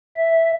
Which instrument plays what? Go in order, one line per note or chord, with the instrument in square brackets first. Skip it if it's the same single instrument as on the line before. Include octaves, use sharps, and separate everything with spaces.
[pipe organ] E5